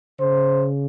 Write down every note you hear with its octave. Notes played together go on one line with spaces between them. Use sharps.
C#3 C5